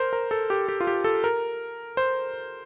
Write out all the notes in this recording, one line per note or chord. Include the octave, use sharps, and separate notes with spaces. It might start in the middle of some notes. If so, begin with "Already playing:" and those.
Already playing: A#4 C5
A#4
A4
G4
G4
F4
G4
A4
A#4
C5